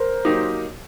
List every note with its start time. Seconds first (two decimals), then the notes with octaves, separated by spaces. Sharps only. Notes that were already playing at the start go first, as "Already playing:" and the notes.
Already playing: A#4 C5
0.25 F#3 A#3 D#4 G4